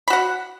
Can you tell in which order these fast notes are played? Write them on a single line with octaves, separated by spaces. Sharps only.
B5 F#4 F#5